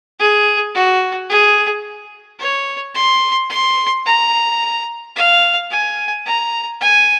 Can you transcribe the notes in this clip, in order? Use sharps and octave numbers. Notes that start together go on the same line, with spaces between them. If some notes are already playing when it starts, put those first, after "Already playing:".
G#4
F#4
G#4
C#5
C6
C6
A#5
F5
G#5
A#5
G#5